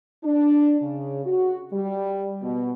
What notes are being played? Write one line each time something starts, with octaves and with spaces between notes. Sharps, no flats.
D4
C#3
F#4
G3
B2